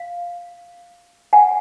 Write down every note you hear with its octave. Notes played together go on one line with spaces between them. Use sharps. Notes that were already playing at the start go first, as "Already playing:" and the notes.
Already playing: F5
F#5 G#5